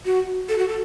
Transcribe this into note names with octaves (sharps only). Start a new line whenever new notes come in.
F#4
A4
F#4
A4